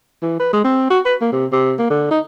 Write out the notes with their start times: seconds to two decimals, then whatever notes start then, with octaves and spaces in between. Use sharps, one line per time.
0.22 E3
0.40 B4
0.53 G#3
0.64 C4
0.90 F#4
1.05 B4
1.21 A#3
1.32 C3
1.52 C3
1.78 A#3
1.90 D3
2.11 D#4